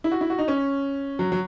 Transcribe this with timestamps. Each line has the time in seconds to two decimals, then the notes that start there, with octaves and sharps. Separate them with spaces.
0.04 E4
0.11 F#4
0.21 E4
0.30 F#4
0.38 D#4
0.48 C#4
1.19 F#3
1.32 F#3